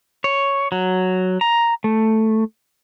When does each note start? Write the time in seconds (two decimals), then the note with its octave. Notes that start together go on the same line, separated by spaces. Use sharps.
0.24 C#5
0.72 F#3
1.41 A#5
1.84 A3